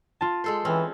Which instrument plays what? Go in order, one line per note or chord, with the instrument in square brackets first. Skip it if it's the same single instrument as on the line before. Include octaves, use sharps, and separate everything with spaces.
[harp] F4 A5
[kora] G#3 A4 C5
[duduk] E3 [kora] C4 C#4